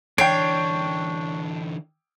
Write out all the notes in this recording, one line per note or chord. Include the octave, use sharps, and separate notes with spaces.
D3 E3 D4 C#5 G5 C7 D7